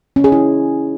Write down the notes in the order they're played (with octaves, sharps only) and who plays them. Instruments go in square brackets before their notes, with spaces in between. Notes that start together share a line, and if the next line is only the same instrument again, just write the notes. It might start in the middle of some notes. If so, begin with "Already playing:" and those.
[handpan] C#4
G#4
E4